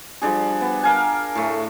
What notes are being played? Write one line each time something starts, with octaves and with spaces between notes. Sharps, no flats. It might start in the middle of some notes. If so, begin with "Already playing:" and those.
F3 G3 D4 G#4
B3
A#4 F5 G#5
A2 A3